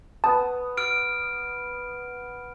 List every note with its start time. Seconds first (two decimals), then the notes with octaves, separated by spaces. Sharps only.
0.24 B3 A5 D#6
0.77 F6 D7